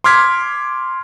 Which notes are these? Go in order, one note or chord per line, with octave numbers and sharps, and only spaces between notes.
C6 D6 F6 G#6 B6